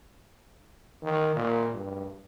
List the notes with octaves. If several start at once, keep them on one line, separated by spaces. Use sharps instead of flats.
D#3
A#2
G2